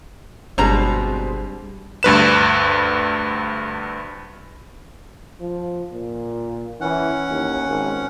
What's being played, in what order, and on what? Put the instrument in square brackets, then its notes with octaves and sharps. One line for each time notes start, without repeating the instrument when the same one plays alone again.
[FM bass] G1 [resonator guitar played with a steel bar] B2 A#5 [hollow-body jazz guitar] G3 D4 F#4 [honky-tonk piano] G#3 C4
[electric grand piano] D2 G2 B4 E7
[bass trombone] F3
A#2
[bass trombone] E3 [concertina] C#4 F#5
[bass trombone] D#2
G#1